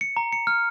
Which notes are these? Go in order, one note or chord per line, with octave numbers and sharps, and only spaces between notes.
C#7
A#5
C#7
F6